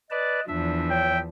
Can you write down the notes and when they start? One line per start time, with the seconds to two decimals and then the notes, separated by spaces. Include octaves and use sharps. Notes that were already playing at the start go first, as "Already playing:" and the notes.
0.11 B4 D5 D#5 A5
0.48 E2 F3 D4 E5
0.91 C#5 G5